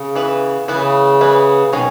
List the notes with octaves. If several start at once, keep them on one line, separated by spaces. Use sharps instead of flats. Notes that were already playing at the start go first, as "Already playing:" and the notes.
Already playing: C#3
E3 B3 E4 B4
C#3 E3 B3 E4 B4
E3 B3 E4 B4
B2 D#3 F#3 C#4 G#4